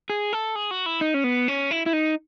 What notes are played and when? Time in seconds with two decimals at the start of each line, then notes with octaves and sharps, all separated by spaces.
0.10 G#4
0.33 A4
0.55 G#4
0.71 F#4
0.86 E4
1.01 D#4
1.14 C#4
1.24 B3
1.48 C#4
1.71 E4
1.86 E4
1.93 D#4